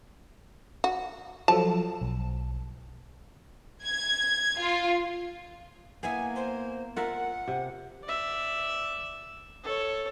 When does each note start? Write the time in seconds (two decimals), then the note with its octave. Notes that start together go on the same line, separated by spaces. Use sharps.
0.84 F#4
1.48 F3 F#3 A4 A5
2.01 B1
3.85 G#6
4.59 F4
6.03 A#3 B3 E4 G#5
6.36 C5
6.96 F4 A#4 E5 F#5
7.48 C3
8.04 D5 E5
9.64 A4 C#5